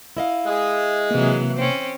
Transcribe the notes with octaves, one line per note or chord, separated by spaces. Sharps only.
E4 D#5 F5
G#3 G#4
C3 E3 F#3 A#3
C4 C#4